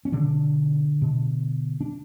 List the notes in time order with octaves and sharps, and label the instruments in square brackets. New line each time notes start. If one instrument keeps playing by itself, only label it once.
[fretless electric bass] C#4
B2 D3 D4
B2
D4